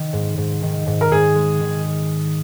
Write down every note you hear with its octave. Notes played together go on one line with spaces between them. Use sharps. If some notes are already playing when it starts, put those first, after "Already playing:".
Already playing: D#3
G#2
G#2
D#3
G#2
A#4
G#2 G#4
G#3
D#3